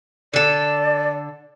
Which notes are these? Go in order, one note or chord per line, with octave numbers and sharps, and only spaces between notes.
D3 A4 D5